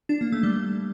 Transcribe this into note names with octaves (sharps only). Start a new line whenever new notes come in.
D4
A#3
A3
G3